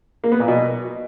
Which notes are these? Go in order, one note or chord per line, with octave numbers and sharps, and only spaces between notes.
A#3
B3
A#2
B2